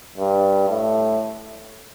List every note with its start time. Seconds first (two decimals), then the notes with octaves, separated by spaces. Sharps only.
0.17 G2
0.70 A2